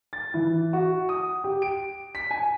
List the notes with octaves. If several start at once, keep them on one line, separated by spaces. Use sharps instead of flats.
A6
E3
F#4
D#6
G4
D7
B6
G#5